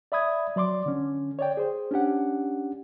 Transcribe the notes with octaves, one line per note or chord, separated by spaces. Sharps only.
D5 E5 B5 D#6 G#6
F#3 D5 C6 D6
D3 C#4
C#5 D5 G5
G#4 C5
C#4 D4 G4 F#5